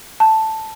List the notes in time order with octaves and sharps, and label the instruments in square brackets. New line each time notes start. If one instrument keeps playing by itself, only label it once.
[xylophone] A5